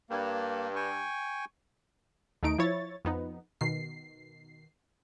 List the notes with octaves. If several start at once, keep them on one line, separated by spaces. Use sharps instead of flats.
G2 A#3
G5 G#5 C#6
D#2 A3 D#4 D7
F3 E4 C#5 A6
F2 B3 D#4
B2 D#3 C7